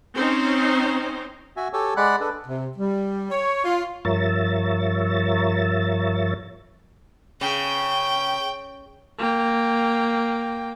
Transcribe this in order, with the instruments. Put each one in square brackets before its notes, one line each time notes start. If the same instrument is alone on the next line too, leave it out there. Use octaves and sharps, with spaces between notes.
[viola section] C4 C#4 D#4 C5
[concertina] F#4 E5 G#5
G4 A4 C#5 G#5 E6
G#3 D5 F#5 B5 F#6
D4 A4 B4
[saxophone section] C3
G3
C#5
F4
[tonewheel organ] G2 F3 A#4 C#5 E5 A6
[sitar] C#3 [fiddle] G5
[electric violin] A#3 G5